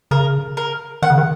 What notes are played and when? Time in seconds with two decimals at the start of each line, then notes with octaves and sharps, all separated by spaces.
0.11 C#3 A#4
0.57 A#4
1.02 D#3 F#5
1.10 C#3
1.18 D#3